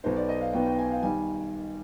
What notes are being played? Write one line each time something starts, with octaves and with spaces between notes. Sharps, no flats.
B1 B2 B3 D#4 C5
D5
D#5
F5
B1 B2 B3 D#4 G5
G5
G#5
F5
D#3 G3 G#5